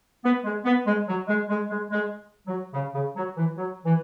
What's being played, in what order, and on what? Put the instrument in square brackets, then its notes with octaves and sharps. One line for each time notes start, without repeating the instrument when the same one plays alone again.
[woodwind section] B3
G#3
B3
G#3
F#3
G#3
G#3
G#3
G#3
F#3
C#3
C#3
F#3
E3
F#3
E3